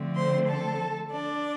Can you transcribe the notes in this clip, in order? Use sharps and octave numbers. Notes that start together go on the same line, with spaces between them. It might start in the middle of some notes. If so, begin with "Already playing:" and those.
Already playing: D3 F3 A3 C4
C5 C6
A4 A5
D4 D5